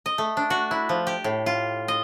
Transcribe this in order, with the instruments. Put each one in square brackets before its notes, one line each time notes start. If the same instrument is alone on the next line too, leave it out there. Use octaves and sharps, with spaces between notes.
[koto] D#5
A3
D4
F#4
E4
F3
G4
A2
F4
D#5